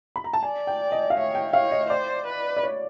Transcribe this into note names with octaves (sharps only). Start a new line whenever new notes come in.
B5
A#5
A5
D5 G#5
G5
D#5
F5
C#5 E5
G5
C#5 F5
D#5
C5 D5
B4
D5
C#5